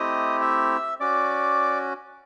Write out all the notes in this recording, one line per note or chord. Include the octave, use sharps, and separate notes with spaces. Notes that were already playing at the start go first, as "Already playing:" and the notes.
Already playing: A3 C4 E4 G4 D#5 D#6
E5 E6
C#4 F#4 D5 D6